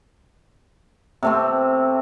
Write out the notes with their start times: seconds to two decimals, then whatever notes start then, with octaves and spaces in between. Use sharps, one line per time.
1.23 C3 A3 C4